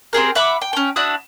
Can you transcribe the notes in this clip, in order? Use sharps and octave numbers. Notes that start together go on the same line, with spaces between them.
C4 G4 G#4 A#4
E5 F#5 B5 D6
G5
C#4 G5
D4 E4 F#4 D#6